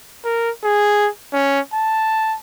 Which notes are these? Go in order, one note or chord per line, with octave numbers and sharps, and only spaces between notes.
A#4
G#4
C#4
A5